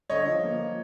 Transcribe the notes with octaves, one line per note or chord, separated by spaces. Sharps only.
D3 C#5 D#5
F3
A#3
F3